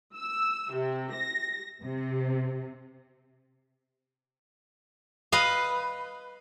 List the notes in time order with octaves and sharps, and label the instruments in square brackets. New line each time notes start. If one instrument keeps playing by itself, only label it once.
[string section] E6
C3
A#6
C3
[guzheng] B4 D#5 F5